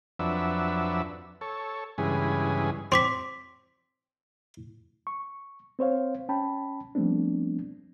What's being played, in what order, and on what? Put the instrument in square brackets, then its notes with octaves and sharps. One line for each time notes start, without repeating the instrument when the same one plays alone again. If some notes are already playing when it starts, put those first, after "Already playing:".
[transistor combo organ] F2 F#3 D4 B4 E5
A4 C#5
G2 C#3 E3 G#3 G#4 B4
[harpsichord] C4 [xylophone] C6 D6 B6
[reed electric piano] C#6
C4 C5 C#5 F5
C#4 G5 A5 B5
F3 G3 A3 B3 C4 D4